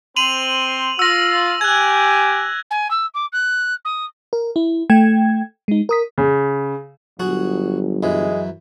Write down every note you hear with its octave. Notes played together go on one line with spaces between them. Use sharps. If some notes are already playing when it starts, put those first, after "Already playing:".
C4 C5 C6 D#7 F7 F#7
F4 E6 A#6
G4 G#5 F#6 G#6
G#5
E6
D6
F#6
D#6
A#4
E4
A3 G5 G#6
G#3 D#4
A#4 D#6 B6
C#3
G1 F#3 F#4 G#4
F#2 E3 G#3